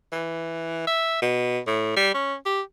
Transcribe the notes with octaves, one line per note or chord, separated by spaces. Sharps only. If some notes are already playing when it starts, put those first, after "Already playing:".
E3
E5
B2
A2
G3
C#4
G4